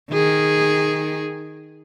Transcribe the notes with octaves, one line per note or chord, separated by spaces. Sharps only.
D#3 G#4